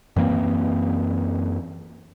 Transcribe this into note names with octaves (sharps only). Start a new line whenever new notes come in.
F#2 E3 A#3 C4